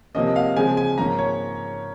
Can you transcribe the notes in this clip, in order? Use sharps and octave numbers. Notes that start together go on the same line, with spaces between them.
C3 F3 A#3 C#4 D#5
F5
C#3 F3 G#3 C4 G#5
G#5
G#2 F3 A#3 C#4 A#5
C#5